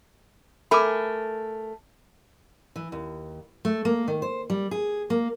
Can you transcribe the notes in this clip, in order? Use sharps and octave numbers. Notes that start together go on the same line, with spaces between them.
A3 A#4 G#5 B5 D6
E3
D#2
A3
A#3
D#3
C5
G3
G#4
A#3